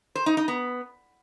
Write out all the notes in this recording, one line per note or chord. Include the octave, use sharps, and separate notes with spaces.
C5
D#4
D#4
B3